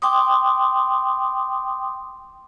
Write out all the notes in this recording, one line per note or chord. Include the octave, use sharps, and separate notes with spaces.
G5 C6 D6 D#6